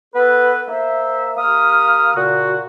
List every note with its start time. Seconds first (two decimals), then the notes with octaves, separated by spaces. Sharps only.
0.14 B3 A4 B4
0.68 A#3 C5 E5
1.37 A#3 G4 D#6 F6
2.15 A#2 C#3 F#4